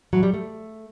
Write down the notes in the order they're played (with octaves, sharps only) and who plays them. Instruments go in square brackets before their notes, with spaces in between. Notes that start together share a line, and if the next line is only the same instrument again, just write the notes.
[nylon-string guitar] A2 E3 F#3
G3
A3